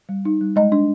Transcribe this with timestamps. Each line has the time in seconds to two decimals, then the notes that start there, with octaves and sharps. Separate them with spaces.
0.09 G3
0.25 D#4
0.41 G3
0.56 G#3 D#5
0.72 D4